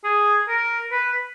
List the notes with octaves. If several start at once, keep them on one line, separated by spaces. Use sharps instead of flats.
G#4
A#4
B4